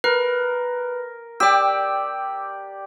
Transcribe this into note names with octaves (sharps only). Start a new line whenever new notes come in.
A#4 B4
G4 D5 G5 E6